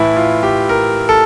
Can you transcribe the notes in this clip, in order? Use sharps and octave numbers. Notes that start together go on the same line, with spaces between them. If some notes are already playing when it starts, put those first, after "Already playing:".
Already playing: A2 E3 E4
F4
G4
A#4
A4